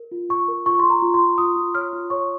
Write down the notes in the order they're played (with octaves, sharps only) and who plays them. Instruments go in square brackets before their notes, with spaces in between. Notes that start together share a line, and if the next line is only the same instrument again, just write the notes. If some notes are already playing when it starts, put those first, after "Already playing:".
Already playing: [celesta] A#4
F4
F4 C#6
A#4
F4 C#6
F4 C6
A#5
F4
C6
F4
F4 D#6
F4
C#5 F6
F4
C#5 C#6